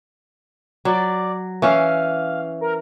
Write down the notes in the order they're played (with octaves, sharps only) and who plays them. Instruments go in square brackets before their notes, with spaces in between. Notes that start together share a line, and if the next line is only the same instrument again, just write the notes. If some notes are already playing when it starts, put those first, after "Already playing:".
[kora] F#3 [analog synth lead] D5
[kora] E3 C#4 [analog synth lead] F5
[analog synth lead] A#4